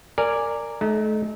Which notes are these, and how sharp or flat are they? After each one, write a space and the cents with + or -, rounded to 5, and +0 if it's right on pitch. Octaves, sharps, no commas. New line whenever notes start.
A#4 -15 D5 +0 G#5 -5
A3 -35 D#4 -10